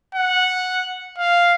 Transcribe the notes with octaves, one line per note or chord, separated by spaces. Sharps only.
F#5
F5